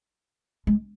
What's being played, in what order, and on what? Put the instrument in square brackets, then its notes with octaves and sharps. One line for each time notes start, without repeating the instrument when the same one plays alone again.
[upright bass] G#3